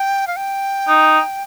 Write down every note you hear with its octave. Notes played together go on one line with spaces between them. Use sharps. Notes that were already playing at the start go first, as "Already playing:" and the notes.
Already playing: G5
F5
G5
D#4